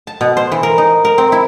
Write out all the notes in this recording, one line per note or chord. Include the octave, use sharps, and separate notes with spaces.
A5
B2
C5
E3
A#4
D#4
A#4
C4
E4